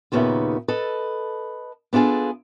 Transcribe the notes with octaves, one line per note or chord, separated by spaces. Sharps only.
D#2 A#2 C#3 B3 D#4 E5
A4 B4 D#5
B3 D4 F4 G#4 A4